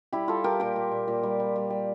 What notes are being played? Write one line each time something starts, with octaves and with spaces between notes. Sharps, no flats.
G3 E4 G4
G3 F4 A4
G3 G4 A#4
A#2 G4 A#4
A#2
A#2
A#2
G3
G3
G3
G3